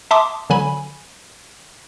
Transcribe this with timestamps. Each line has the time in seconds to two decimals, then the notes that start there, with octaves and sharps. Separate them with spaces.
0.11 E5 A5 C6 D6 D#6
0.50 D3 F#3 G#5 B5